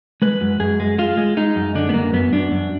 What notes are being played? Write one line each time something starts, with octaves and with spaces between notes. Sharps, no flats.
G#3 B4
F#2
F#2 G#4
G#3
G#3 F4
G#3
G#3 D#4
F#2
D3 D4
B3
F#2 A#3
F#2 B3
F#2 D4
F#2